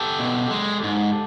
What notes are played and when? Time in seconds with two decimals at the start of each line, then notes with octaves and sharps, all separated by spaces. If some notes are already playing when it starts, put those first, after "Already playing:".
Already playing: G4 A4
0.19 B2
0.51 G#3
0.84 G#2